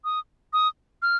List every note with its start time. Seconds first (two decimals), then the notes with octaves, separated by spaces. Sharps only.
0.04 D#6
0.53 D#6
1.02 F6